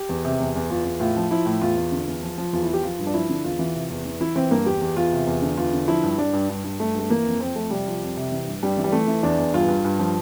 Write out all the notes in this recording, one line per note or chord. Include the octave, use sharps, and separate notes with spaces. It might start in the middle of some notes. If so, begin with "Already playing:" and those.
Already playing: G4
E2
C3
E2
E2
E2 F4
E2
A2 F4
F3
F3 E4
A2
E2 F4
E2
D3
E2
F3
F3
E2 F4
E4
F3
G4
F3 F4
G2
D4
F3 E4
D3
E2 F4
E3
C3
E2
E3
E3 E4
E3 C4
G2 A#3
E2 G4
E2
E2 F4
C3
E2
D3
E2 F4
D3
F3 E4
G2
G2 D4
G2
G2
G2
G2 A3
G2
A3
E3 A#3
F2
F2 C4
F2 A3
C3 G3
F3
F2
C3
E3
G2
G2 G3
E3
G3
E3 A3
E3
E2 D4
E2
G2 F4
G2
G2
F3